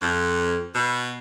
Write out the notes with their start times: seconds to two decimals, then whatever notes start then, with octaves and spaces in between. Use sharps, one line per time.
0.02 F2
0.75 B2